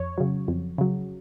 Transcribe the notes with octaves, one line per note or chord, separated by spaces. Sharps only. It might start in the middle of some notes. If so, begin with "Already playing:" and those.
Already playing: F2 C#5
C#3 F#3
F2
C#3 F#3